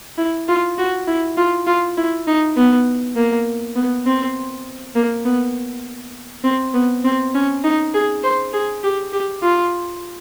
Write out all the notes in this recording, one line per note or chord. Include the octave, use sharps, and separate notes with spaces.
E4
F4
F#4
E4
F4
F4
E4
D#4
B3
A#3
B3
C4
A#3
B3
C4
B3
C4
C#4
D#4
G#4
C5
G#4
G4
G4
F4